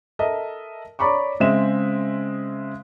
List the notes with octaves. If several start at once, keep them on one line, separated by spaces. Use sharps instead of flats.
A4 A#4 D#5 E5
C#5 D5 A#5 B5 C#6 D6
C#3 G#3 C4 D#5 E5 E7